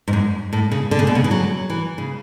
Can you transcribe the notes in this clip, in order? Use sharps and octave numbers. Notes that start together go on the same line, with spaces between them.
G#2
F#2
A2
C#3
D3
C#3
B2
C#3
E3
F#3
E3
C#3